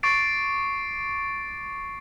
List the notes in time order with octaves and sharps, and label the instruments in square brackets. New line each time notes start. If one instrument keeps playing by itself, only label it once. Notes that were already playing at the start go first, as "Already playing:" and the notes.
[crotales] C#6 D6 A6 C7 D7